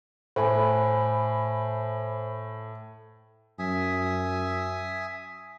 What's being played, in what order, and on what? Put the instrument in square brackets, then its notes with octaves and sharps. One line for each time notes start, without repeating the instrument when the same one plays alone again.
[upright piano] A2 [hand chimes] C5 G#5 B5
[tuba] F#2 [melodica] E5 G#5 D#6